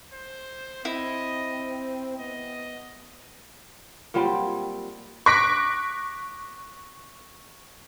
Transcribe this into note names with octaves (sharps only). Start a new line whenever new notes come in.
C5
C4 E4 D#5
B3 D#5
A#2 F#3 G3 C4
C#6 D6 F#6 A#6 B6 D7